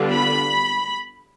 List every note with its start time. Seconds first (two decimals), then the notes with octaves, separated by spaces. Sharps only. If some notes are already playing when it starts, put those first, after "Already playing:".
Already playing: D3 G3 B3 D4 F4
0.11 B5